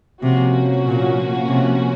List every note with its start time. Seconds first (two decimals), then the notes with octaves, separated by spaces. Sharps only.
0.22 C3 F3 A#3 C#4 F#4
0.86 A#2
1.49 C3